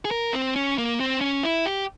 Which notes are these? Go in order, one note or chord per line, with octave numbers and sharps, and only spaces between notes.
G#4
A#4
C4
C#4
A#3
C4
C#4
E4
G4